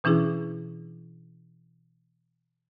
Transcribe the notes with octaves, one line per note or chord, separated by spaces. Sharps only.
B2 E3 C#4 D4 E4 G#4